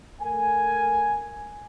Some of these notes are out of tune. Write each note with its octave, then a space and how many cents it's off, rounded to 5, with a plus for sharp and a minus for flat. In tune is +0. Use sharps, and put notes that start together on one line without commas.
A3 +0 A#4 +0 G#5 +0